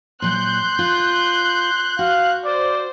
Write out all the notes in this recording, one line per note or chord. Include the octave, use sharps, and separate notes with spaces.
A#2 F#3 C6 F#6 G6
F4
F#4 F5
C5 D5